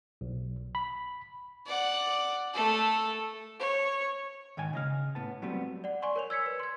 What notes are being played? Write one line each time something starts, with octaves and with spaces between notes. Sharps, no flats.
B1
B5
D5 F#5
A3 A4
C#5
G#2 D#3 C#5 G#5
C#3 D#5 F5
A2 B3 A5
F#3 G3 A3 B3 C4
D5 F#5
D5 G#5 C6 C#6
A#4 C#5 F7
E6 G#6 B6 C#7
B4
C6 G#6